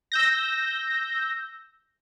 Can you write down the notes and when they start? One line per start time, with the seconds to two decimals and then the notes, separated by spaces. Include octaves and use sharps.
0.12 E6 G6 A#6